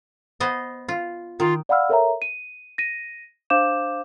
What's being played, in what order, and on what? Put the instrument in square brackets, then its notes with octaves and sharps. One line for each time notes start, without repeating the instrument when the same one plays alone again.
[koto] B3 C5 D#5
F4
[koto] D#3 [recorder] F4
[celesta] D5 F5 F#5 B5 E6 F6
A4 A#4 C#5 E5 G5 A#5
D#7
A#6 D#7
D4 C5 F5 D6 G6 E7